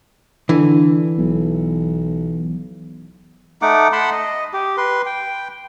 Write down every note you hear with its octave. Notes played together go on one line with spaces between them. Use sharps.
D3 E3
B1
A3 D#4 F#5 D6
F#5 A5 B5 C6
D#5
G4
B4 C6
G5